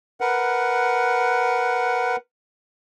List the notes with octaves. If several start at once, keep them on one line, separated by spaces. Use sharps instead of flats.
A#4 B4 F#5